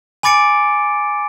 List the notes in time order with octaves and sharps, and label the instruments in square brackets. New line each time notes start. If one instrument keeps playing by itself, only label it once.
[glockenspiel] G#5 B5 D6 A6 C#7 D7